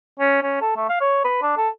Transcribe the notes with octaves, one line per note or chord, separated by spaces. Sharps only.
C#4
C#4
A4
A3
F5
C#5
B4
D4
A4